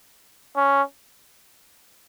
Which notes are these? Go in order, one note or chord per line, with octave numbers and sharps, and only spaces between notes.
C#4